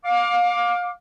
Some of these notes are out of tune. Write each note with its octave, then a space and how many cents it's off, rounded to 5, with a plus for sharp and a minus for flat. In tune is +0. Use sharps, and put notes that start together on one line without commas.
F5 +25 D6 +0